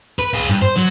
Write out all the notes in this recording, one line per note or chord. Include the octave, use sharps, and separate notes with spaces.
B4
F4 G#4
G2
C5
F#3